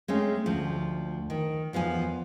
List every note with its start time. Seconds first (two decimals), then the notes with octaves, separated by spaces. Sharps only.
0.08 G#3 A3 C4 C#4
0.46 D2 F3
1.30 D#3
1.73 E2 F3 B3 G#5